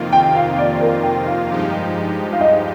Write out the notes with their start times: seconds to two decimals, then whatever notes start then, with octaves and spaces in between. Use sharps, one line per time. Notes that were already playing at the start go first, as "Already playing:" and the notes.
Already playing: F2 C3 D#3 A#3 F4
0.13 G5
0.35 F5
0.58 D5
0.81 A#4
1.03 G5
1.27 F5
1.49 G2 F3 G#3 D#4 G4
2.33 F5
2.41 D#5